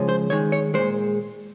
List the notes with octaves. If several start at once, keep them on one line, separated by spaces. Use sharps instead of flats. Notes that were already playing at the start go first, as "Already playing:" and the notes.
Already playing: C#3 F3 G#3
C5
D#3 G#3 C#5
C#5
A#2 G#3 C5